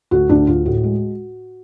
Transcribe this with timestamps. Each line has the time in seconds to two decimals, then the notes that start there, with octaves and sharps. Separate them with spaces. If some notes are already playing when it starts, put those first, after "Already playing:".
0.11 D2 F#4
0.29 D2 D4
0.47 D2 F4
0.65 A2 F#4
0.83 G#3